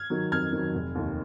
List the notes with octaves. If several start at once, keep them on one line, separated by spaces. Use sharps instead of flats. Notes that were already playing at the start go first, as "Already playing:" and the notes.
Already playing: F6 G#6
D#3 F#3
F2 F6 G#6
D#3 F#3
F1
D#2 D#3